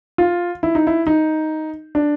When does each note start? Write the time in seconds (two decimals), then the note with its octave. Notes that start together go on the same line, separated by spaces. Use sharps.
0.18 F4
0.63 E4
0.75 D#4
0.87 E4
1.07 D#4
1.95 D4